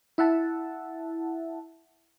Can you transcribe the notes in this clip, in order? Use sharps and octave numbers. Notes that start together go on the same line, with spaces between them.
E4 E5 F#5 A5